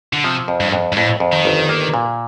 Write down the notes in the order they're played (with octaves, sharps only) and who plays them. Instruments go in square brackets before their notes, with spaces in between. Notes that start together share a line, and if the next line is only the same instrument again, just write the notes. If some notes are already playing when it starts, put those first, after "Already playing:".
[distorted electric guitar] D3
[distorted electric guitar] C3 [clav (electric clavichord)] F3
[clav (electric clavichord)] F2
[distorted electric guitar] G2
[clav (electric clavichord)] F2
[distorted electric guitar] G2
[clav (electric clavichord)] F2 [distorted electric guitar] A2
[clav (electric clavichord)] F2
[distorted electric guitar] D#3
[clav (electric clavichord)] G1
A#3
A#2